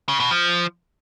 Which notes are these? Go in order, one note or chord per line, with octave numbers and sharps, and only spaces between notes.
C#3
B2
F3